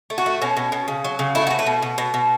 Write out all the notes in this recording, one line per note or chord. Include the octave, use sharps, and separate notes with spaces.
A3
F#4
A3
B2 C#4
B2
B2
C#3
F#3
C#3
A3 E4
F#4
B2
B4
B2
B2
B2
B2